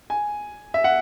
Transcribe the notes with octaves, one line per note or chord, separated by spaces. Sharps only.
G#5
E5
F#5